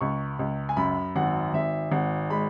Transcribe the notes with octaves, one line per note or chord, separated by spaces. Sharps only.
C#2 C#6
C#2
G#5
F#2 B5
G#1 F#5
G#1 E5
G#1 F#5
G#3 B5